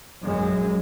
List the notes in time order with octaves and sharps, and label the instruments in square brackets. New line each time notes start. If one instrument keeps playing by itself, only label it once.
[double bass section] A#1 F#2 F#3 G#3